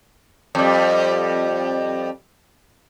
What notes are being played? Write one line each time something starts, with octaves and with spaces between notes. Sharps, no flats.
F2 G3